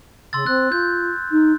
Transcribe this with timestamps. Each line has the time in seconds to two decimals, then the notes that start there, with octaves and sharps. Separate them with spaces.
0.33 C#3 C6 E6 A6
0.46 C4 F#6
0.72 F4 G6
1.31 D#4